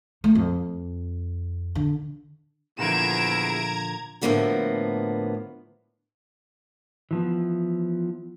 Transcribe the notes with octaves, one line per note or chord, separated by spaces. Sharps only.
A3
F2
D3
E2 A#2 D3 F3 A#5 G#6 D7 E7
A2 D3 F3 A#3 B3 F#4
E3 F3 B3